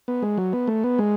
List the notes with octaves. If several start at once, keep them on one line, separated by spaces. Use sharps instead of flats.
B3
G#3
F#3
B3
A3
B3
G#3